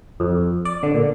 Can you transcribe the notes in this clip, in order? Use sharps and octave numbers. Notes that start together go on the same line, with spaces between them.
F2
D5
D3
A#2